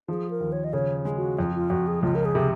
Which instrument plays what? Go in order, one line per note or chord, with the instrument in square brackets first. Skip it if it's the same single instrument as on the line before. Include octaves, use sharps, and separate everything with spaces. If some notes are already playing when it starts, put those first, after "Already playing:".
[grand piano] F3 [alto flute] G#4
[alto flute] A#4
[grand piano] D#2
[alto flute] C#5
D#5
[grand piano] C#3 [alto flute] C#5
[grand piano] G#3
[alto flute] F#4
[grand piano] F2 [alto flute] F4
[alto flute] F4
[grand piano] F2 [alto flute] F#4
[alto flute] G#4
[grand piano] C#2 [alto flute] F4
[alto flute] A#4
G#4
[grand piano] C3